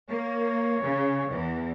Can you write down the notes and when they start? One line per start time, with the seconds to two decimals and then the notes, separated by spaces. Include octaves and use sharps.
0.10 A#3 C#5
0.82 C#3
1.30 E2 E3